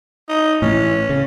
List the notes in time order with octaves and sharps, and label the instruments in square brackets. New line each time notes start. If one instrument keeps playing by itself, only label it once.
[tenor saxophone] D#4
[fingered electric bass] A2 E3 [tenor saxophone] C#4
[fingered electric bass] C#3